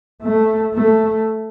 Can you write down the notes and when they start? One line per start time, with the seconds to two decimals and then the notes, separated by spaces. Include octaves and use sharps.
0.22 A3
0.74 A3